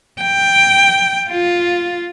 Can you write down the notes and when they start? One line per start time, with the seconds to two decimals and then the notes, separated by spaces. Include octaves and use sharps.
0.22 G5
1.29 F4